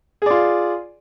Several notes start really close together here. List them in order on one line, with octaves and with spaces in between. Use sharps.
G#4 D5 F4